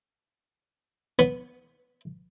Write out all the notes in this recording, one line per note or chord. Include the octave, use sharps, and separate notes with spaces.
B3